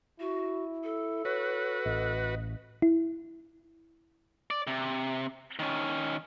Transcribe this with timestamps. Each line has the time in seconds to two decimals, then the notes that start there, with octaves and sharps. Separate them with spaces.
0.20 E4 F#4
0.84 A4
1.25 F#4 B4 C#5
1.86 A1 D#5
2.82 E4
4.51 D5
4.67 C3
5.59 D#3 C#4